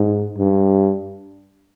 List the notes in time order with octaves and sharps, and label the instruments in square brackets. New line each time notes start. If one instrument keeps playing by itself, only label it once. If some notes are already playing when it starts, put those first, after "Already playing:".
Already playing: [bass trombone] G#2
G2